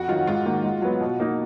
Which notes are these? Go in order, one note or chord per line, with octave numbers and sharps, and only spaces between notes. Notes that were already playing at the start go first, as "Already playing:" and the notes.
Already playing: F2 F#4
D#3 F#3 F4
G#2 F4
D#3 A#3
G#2
F#3 B3
B2
A#3 D#4